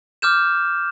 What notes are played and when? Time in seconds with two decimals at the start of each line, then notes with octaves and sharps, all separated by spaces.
0.22 D6 F6 G6 E7